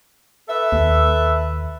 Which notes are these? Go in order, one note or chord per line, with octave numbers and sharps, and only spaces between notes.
A4 B4 E5
D#2